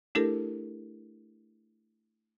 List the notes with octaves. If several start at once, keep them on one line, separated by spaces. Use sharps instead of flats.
A3 D4 E4 G4 A4 A#4